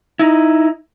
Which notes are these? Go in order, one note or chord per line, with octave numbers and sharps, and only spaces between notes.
D#4 E4